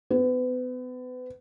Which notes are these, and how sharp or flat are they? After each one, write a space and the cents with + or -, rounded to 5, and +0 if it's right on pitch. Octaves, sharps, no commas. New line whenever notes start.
B3 +35